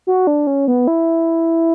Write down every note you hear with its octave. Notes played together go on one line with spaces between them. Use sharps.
F#4
D4
C#4
B3
E4